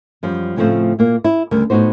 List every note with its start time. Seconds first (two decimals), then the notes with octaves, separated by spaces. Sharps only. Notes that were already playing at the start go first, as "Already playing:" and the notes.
0.23 F#2 F3 G3
0.56 A2 C#3 F3 A3 C4 F4
0.99 A#2 A#3
1.24 E4
1.51 D2 C#3 G3 A#4
1.70 A2 B3 D#4 F#4 C5